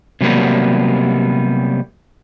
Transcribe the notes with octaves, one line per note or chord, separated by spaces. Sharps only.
C3 F#3 G3 A#3 B3